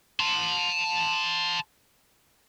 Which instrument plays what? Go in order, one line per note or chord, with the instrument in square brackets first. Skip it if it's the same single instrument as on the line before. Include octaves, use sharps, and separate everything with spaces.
[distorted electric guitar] A5 C6